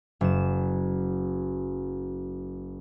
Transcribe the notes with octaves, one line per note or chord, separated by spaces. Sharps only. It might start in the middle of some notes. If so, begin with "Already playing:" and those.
F#1 E7